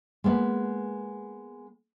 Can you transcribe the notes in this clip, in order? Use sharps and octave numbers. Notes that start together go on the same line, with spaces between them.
G#3 A#3 B3